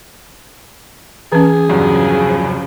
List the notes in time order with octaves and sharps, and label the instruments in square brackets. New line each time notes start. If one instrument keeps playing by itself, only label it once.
[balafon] E3 C#4 [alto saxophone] G#4
[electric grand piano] E2 G2 F#3 [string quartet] C#3 F3